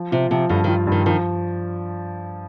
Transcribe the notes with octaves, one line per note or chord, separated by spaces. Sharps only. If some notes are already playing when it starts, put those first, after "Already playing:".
Already playing: F3
C3 F4
C3 F3
G2 D3
D#3 F4
G2 D#3
D#3 F3